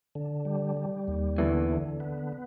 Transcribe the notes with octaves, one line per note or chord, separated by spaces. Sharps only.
D3
G3
G3
D#2
E2 D3 E3
D3
B3